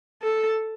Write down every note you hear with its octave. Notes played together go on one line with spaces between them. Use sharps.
A4